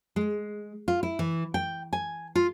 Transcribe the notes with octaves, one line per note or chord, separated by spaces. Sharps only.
G#3
F4
E4
E3
G5
G#5
F4